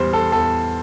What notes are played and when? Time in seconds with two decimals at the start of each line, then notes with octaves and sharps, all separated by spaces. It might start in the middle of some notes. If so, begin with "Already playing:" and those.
Already playing: E2 G3 C5
0.13 A4
0.32 E2 A4